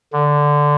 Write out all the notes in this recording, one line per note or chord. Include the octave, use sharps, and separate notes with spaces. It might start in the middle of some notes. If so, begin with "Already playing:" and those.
D3